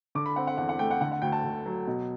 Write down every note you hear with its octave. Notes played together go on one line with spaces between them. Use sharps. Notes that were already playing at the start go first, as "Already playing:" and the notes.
D3 D6
B5
C4 F#5
F#5
E2 F#5
F#5
A3 G5
F#5
D3 F#5
F#5
D2 G5
A5
D2
F#3
B2